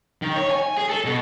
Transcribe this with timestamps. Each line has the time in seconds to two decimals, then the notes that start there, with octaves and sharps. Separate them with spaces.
0.22 D#3
0.36 C#5
0.51 G#5
0.77 G#4
0.90 A4
1.05 B2